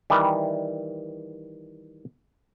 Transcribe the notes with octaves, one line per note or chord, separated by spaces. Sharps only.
D#3 E3 G3